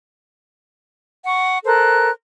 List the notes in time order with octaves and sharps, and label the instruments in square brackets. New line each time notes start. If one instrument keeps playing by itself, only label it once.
[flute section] F#5 C#6
A4 A#4 C5 F#6